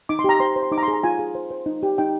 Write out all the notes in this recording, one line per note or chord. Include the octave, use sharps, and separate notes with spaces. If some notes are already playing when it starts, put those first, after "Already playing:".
D#4 D6
C6
G4 A#5
C5 C6
C5
C6
D#4 D6
A#5
C6
G#4
A#5
F4 G#5
G#4
C5
C5
D#4
G4
D#4 G5